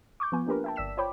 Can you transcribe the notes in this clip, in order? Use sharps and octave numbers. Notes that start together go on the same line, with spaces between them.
C#6 D6 G6
F3 B3 F4 G#5
A#3 D4 G4 A#4 B4
E5 G5 A5
G1 D5 E6 B6 E7
F4 C5 C#5 G5 B5 D6